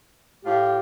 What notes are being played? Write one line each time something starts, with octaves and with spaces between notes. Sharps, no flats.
A2 F4 G4